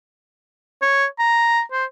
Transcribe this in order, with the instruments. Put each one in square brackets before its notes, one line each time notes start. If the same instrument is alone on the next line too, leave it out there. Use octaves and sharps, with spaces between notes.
[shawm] C#5
A#5
C5